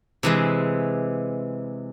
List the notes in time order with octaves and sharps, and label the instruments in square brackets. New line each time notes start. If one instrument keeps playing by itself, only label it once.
[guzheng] C3 E3 G#3